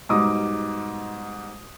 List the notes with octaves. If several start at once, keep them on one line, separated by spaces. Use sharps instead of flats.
G#2 B2 G3 D#4 D6 D#6